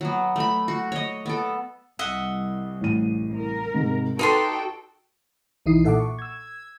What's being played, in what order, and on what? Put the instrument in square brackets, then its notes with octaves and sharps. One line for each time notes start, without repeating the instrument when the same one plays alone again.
[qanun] F#3 B3
A3 B5
F#4
C#5 D#5
B3 A4
[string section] C2 [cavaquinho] D#5 E5 F#5
[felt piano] A1 D#7
[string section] A#4
[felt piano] G#2 C3
[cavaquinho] D#4 D5 C6 [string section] F#4 A4 G5 [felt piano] B4
[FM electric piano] B1 E3 D#4 E4 D#6 C7
A#2 A4 E5 F#5 A5 D6
C#6
E6 G#6